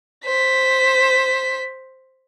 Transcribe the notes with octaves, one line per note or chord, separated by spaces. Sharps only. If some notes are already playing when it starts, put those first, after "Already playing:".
C5 B6